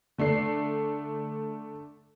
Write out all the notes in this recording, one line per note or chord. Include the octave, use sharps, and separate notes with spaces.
D3 A3 D4 C7